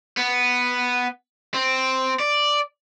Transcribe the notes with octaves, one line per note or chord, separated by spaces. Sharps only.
B3
C4
D5